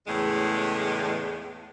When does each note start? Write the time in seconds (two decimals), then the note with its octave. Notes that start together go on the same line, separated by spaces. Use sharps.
0.07 E2 A2 C#3 G#3